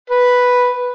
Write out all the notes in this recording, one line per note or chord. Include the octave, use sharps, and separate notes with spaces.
B4